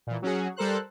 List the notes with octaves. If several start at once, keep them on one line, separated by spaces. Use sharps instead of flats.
A#2 E3
F#3 C#4 F#4 G#4
G3 A4 A#4 C5 F#6